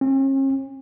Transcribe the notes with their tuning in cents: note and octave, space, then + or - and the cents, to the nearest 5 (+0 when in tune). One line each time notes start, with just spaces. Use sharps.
C#4 -45